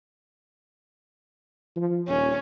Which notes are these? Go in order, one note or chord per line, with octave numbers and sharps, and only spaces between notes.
F3
D#1 C#4